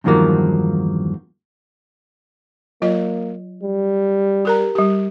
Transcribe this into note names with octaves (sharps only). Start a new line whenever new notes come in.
E2 G2 D#3 F3 F#3 A#3
F#3 A#3 F4 D#5
G3
G4 A#4 A#5
G3 G4